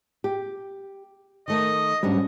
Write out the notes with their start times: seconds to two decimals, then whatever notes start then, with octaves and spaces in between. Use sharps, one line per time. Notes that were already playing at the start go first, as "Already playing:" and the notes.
0.24 G4
1.48 D#3 A3 A#4 D#5
2.03 G#2 F#3 G3 C#4 D4